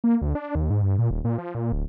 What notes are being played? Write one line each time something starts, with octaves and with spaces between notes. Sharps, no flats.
A#3
D2
D4
D#2
G#2
G2
A#2
D#1
A#2
F3
A#2
D1